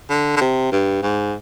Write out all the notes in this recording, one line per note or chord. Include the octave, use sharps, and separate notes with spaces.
D3
D3
C3
G2
G#2